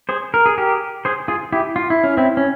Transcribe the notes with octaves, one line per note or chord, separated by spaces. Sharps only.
G#4 C5
A#4
G#4
G4 A#4
G#4 C5
F4 G#4
E4 G4
F4
E4
C#4
C4 E4
C#4